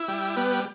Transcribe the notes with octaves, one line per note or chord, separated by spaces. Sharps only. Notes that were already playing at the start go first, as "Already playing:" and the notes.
Already playing: E4
G3
B3